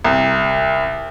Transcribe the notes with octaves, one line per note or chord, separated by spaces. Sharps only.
C2